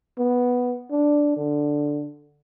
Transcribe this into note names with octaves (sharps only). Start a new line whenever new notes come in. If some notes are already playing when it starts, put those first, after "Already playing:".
B3
D4
D3